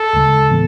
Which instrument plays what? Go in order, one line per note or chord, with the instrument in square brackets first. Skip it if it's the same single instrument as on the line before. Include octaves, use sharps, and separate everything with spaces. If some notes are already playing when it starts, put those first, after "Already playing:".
Already playing: [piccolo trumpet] A4
[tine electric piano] D2 C#3 G#3
A2 E3 B3